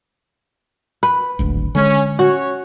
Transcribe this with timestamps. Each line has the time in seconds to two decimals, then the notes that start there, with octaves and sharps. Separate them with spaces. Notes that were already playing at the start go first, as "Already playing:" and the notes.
1.03 B4
1.39 D1 G#1 D2
1.75 D3 G#3 C#4
2.19 C#4 F#4 C#5